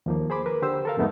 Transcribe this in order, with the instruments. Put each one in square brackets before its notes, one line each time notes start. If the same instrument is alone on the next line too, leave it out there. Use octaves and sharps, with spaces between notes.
[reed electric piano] D#2 F3 A#3
G#4 C5 B5 D6
A#4 B4
D3 G4 C5 E6
A4 A#4 F5
F2 G#2 G#3 A3 B3 D#4